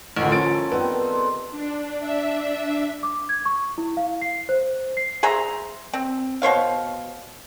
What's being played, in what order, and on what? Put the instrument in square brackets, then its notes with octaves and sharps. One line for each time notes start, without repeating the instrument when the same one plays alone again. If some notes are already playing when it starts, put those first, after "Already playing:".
[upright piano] A1 D2 [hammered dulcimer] A#3 F4
[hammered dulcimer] F3 [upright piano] C#4 A6 D7
[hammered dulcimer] A4
[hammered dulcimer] D#3 G3 C4 [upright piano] B3
[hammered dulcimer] C5
[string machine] D4
D4 E5
[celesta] D6
G#6
C#6
E4
F5
C7
C5
C7
[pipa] G#4 C5 E5 A#5
C4
B2 C5 C#5 F5